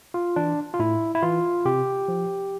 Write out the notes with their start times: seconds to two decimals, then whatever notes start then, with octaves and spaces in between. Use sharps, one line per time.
0.14 F4
0.36 E3 D4
0.74 F4
0.79 A2 E4
1.15 E4
1.22 E3 F4
1.65 C3 G4
2.08 F3